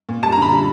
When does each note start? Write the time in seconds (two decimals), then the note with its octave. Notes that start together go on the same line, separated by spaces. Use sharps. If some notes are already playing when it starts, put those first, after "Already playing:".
0.09 A#2
0.23 G3 A5
0.32 A#5
0.37 D3
0.42 B5
0.52 G3